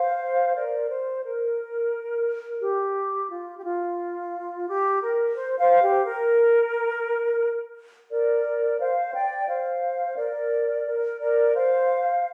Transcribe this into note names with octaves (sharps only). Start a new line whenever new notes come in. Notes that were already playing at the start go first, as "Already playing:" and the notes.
Already playing: C5 F5
A#4 D5
C5
A#4
G4
F4
G4
F4
G4
A#4
C5
C5 F5
G4
A#4
A#4 D5
C5 F5
D5 G5
C5 F5
A#4 D5
A#4
A#4 D5
C5 F5